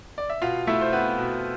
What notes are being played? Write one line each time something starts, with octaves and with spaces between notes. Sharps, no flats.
D5
E5
B2 F4 F5
A3 E4 E5
C5
B3 C4 B4
B2